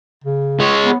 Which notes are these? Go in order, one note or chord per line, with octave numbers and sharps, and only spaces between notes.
C#3
G#3 C#5
B3